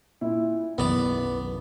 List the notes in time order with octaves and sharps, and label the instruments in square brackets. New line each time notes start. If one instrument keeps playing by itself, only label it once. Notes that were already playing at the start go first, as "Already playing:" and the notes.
[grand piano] A#2 E4
[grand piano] F#1 [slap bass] B1 D#3 E3 [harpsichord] B3 D5